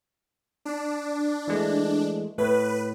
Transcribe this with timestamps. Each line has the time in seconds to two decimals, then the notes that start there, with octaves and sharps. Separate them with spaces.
0.65 D4
1.48 E3 G#3 A3
2.38 A2 B4